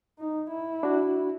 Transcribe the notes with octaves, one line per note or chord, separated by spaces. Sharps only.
D#4
E4
D4 F#4